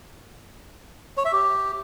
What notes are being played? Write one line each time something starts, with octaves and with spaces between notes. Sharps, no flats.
C#5
E5
G4